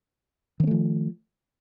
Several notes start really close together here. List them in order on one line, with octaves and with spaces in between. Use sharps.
D#3 C4 A3 F3